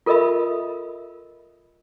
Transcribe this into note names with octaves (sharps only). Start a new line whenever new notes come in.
F4 A4 A#4 D#5 E5 B5